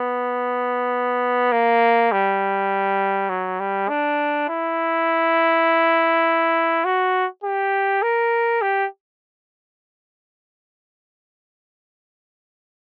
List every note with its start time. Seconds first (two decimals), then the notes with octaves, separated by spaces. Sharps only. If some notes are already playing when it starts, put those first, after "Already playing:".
Already playing: B3
1.52 A#3
2.12 G3
3.30 F#3
3.60 G3
3.89 D4
4.49 E4
6.85 F#4
7.44 G4
8.02 A#4
8.62 G4